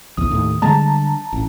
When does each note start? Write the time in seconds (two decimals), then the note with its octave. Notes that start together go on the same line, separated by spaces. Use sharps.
0.17 A#1 E2 D#6
0.31 D#2 A2
0.62 D3 G3 G#3 A5 A#5
1.33 A1